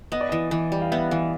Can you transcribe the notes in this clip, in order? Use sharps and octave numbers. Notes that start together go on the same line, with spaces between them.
B3 D#5
D5
E3 D#5
E3
G3
F5
B3 E5
E3 F5